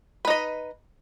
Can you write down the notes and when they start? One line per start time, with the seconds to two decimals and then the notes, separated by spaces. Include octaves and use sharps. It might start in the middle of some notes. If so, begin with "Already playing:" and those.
0.25 B4
0.27 D#4
0.30 D#5